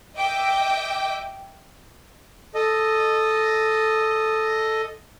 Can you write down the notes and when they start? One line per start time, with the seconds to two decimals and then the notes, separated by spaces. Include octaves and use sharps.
0.17 D#5 E5 G5 D6
2.55 A4 D#5